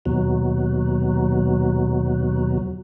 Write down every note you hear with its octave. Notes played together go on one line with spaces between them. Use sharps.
D#2 B2 F#3